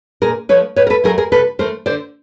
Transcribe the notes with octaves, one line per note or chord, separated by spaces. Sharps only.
A#2 G#4 A#4
F3 A3 B4 C#5
A2 B4 C#5
A#4
A4 B4
F#3 A3 G#4 A#4
G#4 A#4
C3 A4 B4
E3 A3 A#4 C5
D3 C5 D5